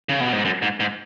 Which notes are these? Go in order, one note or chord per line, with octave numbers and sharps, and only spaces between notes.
C#3
B2
G#2
F#2
G#2
G#2